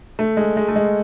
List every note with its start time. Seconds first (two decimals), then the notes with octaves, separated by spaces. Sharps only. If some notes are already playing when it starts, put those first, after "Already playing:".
0.19 A3
0.37 G#3
0.57 G#3
0.68 A3
0.76 G#3